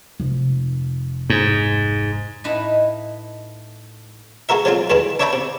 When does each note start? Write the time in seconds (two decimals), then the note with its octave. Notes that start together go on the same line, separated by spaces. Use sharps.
0.20 F1
1.30 G#2
2.44 A2 D#4 E4 B4 D#5
4.49 G#3 A3 F#4 A#4 E5
4.65 F3 F#3 G#3 C4 F4
4.90 D2 G2 E3 G3 G#3
5.20 D4 C#5 E5 G5 A5 B5
5.33 C3